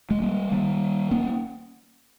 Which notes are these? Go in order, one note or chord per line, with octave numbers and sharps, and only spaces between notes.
G#3
G3 A#3
D#3 G3
A#3 C#4